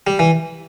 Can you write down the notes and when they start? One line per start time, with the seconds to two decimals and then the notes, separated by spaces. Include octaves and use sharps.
0.07 G3
0.19 E3